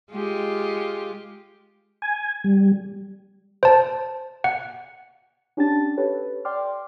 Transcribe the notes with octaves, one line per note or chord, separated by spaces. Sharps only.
G#3 F4 G4
G#5
G3
C5 A5
F#5
C#4 D4 G4 G5 A5 A6
G4 A4 B4 C#5
D5 G5 C6 D6 F6